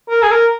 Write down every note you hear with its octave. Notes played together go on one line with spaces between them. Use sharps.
A#4
G#4
A#4